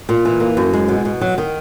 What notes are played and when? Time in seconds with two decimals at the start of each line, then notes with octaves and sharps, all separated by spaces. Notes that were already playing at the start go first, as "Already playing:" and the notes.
0.09 A#2
0.25 E3
0.40 A#3
0.57 F#2
0.73 G#3
0.88 B2
1.05 B2
1.21 F#3
1.38 D#3